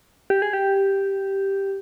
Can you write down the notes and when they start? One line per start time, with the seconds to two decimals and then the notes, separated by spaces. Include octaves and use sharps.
0.30 G4
0.42 G#4
0.53 G4